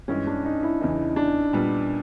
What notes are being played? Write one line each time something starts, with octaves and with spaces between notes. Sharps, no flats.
G2 E3 G#3 C#4
D4
D#4
E4
E2 C#3 E3 D#4
D4
A#2 G3 B3